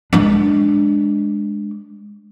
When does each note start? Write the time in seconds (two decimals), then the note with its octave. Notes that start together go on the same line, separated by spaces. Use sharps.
0.13 G#3 D4